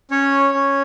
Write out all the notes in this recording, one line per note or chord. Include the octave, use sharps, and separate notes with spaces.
C#4 C#5
C#4